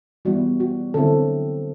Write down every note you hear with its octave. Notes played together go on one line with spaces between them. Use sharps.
E3 G3 B3 E4 F#4
F#4
D3 F#3 C4 E4 A4